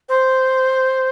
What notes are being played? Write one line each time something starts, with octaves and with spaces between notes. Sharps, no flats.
C5